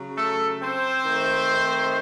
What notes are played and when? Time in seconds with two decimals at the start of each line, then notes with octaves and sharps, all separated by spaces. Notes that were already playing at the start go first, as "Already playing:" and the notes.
Already playing: C#3 F#3
0.17 A3 A4
0.61 C4 C5
1.05 D#3 A3 D#4